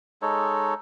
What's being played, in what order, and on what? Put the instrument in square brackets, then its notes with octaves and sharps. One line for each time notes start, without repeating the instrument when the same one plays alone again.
[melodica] G#3 D#4 A4 C#5